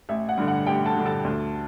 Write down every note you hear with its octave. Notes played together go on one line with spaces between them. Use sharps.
A1 E5
F#5
G2 D3
F#5
A1 G4 G5
A4 A5
G2 D3
A4 A5
D2